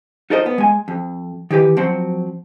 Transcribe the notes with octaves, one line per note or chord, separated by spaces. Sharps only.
D#4 F4 A4 A#4 C5 D#5
B3
G#3 G#5
F2
D#3 E3 G4 B4
F3 F#3 C4 F#4 C5